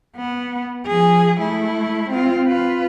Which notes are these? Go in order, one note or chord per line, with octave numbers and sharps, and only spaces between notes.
B3
F3 G#4
A3 E4
C4 F4
F4 B4